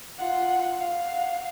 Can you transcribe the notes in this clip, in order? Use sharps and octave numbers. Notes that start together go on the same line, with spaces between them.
F4 F#5
F5 F#5